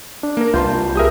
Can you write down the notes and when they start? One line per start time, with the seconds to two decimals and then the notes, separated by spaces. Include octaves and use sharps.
0.23 D4
0.37 A#3 A#4
0.54 C2 F4 B4 A5 C6 G6
0.95 G4 G#4 A#4 E5 D#6 G6